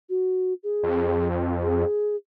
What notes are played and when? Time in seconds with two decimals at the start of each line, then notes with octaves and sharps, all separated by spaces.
0.09 F#4
0.63 G#4
0.83 F2
1.62 G#4